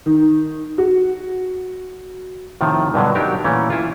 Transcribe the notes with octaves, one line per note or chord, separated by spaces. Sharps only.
D#3
F#4
A2 C3 D#3 F3
G2 B2 D3 F#3
F#3 D4 D#4 G4 A#4
A#2 E3 A3 C#4
E4 F4